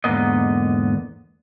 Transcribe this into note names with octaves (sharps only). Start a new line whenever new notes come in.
E2 G#2 D3 A#3 B3 D#5